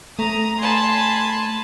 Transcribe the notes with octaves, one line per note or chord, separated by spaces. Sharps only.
A3 A#5 D#6
G#5 A5 B5 C6